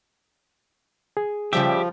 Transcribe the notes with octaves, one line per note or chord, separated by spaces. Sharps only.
G#4
C#3 F3 G3 G4 E5 G5